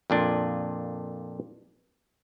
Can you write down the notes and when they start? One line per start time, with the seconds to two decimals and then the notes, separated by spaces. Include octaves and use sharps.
0.10 F2 A#2 D4 F4